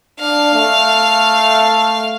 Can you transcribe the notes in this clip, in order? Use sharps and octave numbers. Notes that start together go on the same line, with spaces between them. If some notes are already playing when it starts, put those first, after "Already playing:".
D4 F5
A3